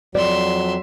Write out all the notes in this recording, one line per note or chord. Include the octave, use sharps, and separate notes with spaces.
F2 F#3 D5 E5 C6